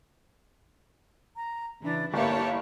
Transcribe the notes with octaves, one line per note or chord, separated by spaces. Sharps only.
A#5
C#3 E3 D4
G1 A#3 E4 G4 C#5 A5